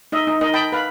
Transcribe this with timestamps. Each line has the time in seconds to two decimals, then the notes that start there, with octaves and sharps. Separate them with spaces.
0.12 D#4 D#5 E5
0.27 D#4
0.41 D#4 A#4 D#5
0.54 G5 A5 B5
0.72 B4 F5 B5